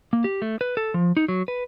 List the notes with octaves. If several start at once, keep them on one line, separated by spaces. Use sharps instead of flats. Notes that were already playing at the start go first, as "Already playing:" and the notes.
A#3
G4
A3
B4
A4
F3
D#4
F#3
B4